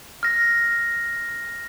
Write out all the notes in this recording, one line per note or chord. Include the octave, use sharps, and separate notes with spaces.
F6 A#6